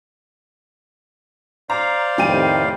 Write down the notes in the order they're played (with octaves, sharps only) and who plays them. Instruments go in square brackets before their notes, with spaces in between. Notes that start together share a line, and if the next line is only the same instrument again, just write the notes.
[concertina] C5 D5 F5 [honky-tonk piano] A#5
[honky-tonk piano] F1 G5 D#7 [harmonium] A2 C3 D#3